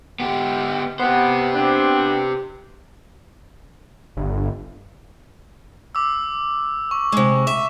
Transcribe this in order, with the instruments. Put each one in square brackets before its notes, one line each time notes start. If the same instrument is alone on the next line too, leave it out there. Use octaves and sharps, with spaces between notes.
[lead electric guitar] B3 G4
[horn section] B3 [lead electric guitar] G4 C5
[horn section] B3 C4 D4
[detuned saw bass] G1
[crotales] D6 E6
C#6
[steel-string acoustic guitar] C3 G#3 [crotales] C#6
[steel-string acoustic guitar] E5 [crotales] C#6 E7